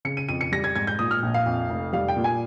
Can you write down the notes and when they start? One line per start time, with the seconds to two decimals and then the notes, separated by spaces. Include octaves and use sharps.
0.05 C#3 C#7
0.17 D#7
0.29 F2 D#7
0.41 C#7
0.52 G3 A#6
0.64 G#6
0.76 G#2 G#6
0.87 G6
0.99 A#2 D#6
1.11 F6
1.23 A#1
1.34 F5
1.46 F2
1.70 F1
1.93 G3 F5
2.08 G5
2.17 A#2
2.24 G#5